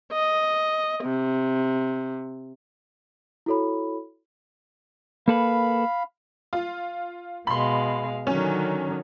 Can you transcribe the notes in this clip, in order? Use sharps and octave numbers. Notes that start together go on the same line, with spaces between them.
D#5
C3
E4 F#4 A4 C#5 B5
A#3 A4 B4 F5 B5
F4
B2 G#3 F5 B5 C6
D3 D#3 F#3 C#4